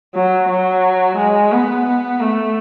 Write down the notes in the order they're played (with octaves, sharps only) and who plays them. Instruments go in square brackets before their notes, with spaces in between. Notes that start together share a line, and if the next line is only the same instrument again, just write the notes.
[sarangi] F#3
F#3
G#3
B3
B3
A3